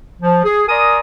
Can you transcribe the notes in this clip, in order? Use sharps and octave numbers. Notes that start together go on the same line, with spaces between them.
F3
G#4
A#4 D5 G#5 A#5 C6 D#6